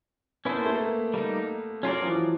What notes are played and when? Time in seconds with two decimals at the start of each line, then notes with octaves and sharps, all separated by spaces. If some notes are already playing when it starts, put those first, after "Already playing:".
0.45 B3 C#4 E4 A4 C5
0.55 A#3
0.66 A3
0.75 A#3
1.14 G3 A#3 D#4
1.83 F#3 C#4 F4 A#4 D5
2.02 F3
2.06 E3